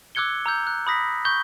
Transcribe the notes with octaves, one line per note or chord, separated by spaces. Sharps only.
D6 E6 F#6 G#6 C#7 G7
A#5 E6 G6
F#6
B5 D#6 A#6 B6
C#6 G6 G7